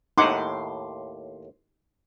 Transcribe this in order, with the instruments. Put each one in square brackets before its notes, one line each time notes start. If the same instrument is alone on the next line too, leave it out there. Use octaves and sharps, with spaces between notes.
[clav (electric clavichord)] D#2 A2 [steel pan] D#4 F#5 [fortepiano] C6 D6